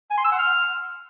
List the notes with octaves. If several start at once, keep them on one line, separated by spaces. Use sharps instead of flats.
G#5
C6
E6
F#5
F6